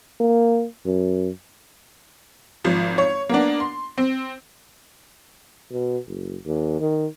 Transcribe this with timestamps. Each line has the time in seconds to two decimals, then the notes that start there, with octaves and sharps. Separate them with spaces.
0.20 A#3
0.86 F#2
2.64 G#1 F3
2.98 C#5
3.29 A#3 B3 D4
3.60 C6
3.98 C4
5.71 B2
6.07 F#1
6.46 D#2
6.80 D#3